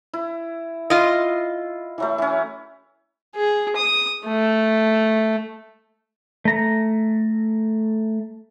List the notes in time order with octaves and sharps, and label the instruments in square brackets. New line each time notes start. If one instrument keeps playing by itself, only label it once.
[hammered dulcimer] E4
[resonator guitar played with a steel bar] F4 D#5
[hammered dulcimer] E3 F#3 A3
E3 C#4
[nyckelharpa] G#4
D#6
A3
[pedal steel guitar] A3 A#5